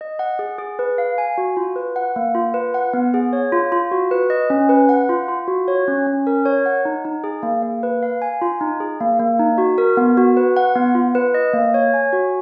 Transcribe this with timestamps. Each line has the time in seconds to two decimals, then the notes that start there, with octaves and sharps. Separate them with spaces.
0.01 D#5
0.19 F#5
0.39 G#4
0.58 G#4
0.79 B4
0.98 F5
1.18 G#5
1.38 F#4
1.57 F4
1.76 B4
1.96 F#5
2.16 A#3
2.35 F4
2.54 B4
2.74 F#5
2.94 B3
3.14 G#4
3.33 C#5
3.52 F4
3.72 F4
3.91 F#4
4.11 B4
4.30 D#5
4.50 C#4
4.69 B4
4.89 F#5
5.09 F4
5.28 F4
5.48 F#4
5.68 C#5
5.88 C#4
6.07 C#4
6.27 A#4
6.46 C#5
6.66 F#5
6.85 D#4
7.05 D#4
7.24 G#4
7.43 A#3
7.63 A#3
7.83 B4
8.03 F5
8.22 G#5
8.42 F4
8.61 D#4
8.80 G#4
9.00 A#3
9.19 A#3
9.39 D#4
9.58 F#4
9.78 A#4
9.97 B3
10.17 F#4
10.37 B4
10.57 F#5
10.75 B3
10.95 F4
11.15 B4
11.34 D#5
11.53 A#3
11.74 C#5
11.94 G#5
12.13 F#4